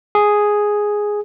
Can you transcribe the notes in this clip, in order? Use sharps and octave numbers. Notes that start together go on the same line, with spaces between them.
G#4